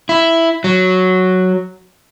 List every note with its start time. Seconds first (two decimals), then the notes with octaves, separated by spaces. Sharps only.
0.09 E4
0.64 F#3